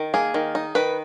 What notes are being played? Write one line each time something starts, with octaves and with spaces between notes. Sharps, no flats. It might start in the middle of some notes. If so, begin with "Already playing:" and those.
Already playing: D#3
A#3 G#4
D#3
D#4
D#3 B4